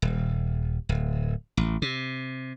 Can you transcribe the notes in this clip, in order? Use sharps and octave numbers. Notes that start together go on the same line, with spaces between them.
D#1
D1
A1
C3